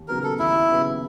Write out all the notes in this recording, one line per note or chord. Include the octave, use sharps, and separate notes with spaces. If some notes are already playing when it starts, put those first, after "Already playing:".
Already playing: D#2
C#3 F#3 B3 A#4
A4
D#2 E4
C#3 F#3 B3